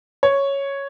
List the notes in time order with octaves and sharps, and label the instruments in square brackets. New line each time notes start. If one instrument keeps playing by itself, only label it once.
[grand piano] C#5